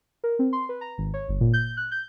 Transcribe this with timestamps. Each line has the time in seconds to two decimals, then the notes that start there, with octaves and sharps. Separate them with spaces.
0.24 A#4
0.39 C4
0.53 C6
0.69 B4
0.81 A#5
0.98 G#1
1.14 C#5
1.28 G1
1.41 A#2
1.53 G6
1.77 F#6
1.91 G6